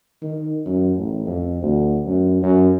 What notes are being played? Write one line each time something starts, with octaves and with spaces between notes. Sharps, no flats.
D#3
F#2
A1
F2
D2
F#2
F#2